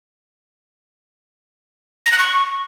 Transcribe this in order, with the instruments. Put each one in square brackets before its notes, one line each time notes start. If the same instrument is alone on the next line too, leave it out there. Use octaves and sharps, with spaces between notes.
[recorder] A#6
F#6
C#6